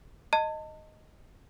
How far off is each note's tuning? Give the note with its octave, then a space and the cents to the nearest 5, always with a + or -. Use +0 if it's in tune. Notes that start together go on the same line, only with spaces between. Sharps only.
D#5 +0 A5 +35